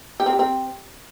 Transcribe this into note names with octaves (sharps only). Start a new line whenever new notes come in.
G4
C4
G4
C4